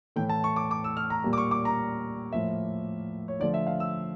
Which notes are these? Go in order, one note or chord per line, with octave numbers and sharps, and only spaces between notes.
A2 E3 A3 G5
A5
C#6
D6
D6
E6
F6
A#5
A#2 G3 A#3
D6
C#6
D6
A#5
A2 F3 A#3 E5
C#5
D3 F3 A3 D5
E5
F5
E6